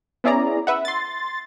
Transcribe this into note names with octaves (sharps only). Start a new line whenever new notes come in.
B3 C#4 E4 G#4 D5 A#5
B4 E5 F#5
C6 A6